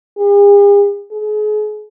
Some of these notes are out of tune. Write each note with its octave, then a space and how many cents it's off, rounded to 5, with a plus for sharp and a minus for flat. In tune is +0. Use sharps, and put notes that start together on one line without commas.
G#4 -45
G#4 +35